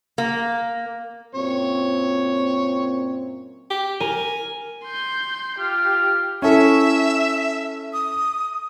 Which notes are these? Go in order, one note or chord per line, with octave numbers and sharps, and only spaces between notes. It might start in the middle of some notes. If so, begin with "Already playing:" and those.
A#3
F#2 A#2 C4 C#5
G4
A#4 G#5
C6 G6
F4 G4
C#4 E4 A4 E5
D#6